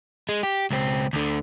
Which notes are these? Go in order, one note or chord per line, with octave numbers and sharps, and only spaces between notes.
G#3
G4
C#2 C4
D2 D3